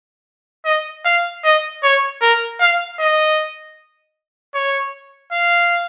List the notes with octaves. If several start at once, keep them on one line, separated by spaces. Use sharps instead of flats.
D#5
F5
D#5
C#5
A#4
F5
D#5
C#5
F5